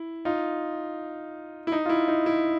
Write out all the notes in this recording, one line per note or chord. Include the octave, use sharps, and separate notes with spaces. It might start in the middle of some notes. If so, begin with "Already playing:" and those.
Already playing: E4
D#4 F4
E4
D#4
F4
E4
D#4
E4